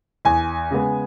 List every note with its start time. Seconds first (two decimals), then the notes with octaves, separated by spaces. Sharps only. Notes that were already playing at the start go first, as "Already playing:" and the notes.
0.25 E2 G#5
0.71 C#3 G#3 B3